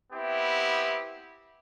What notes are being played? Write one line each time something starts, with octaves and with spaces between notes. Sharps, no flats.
B3 C4 E4 G4